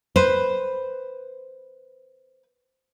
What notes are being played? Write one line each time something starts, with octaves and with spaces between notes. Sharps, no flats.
B4 C5